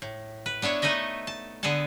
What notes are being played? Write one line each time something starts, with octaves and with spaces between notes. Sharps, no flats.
A2
B4
B3 D4 E4 C#5
A3 D#4 B4 D#5 E5
A5
D3 B3 G#4 A4 A5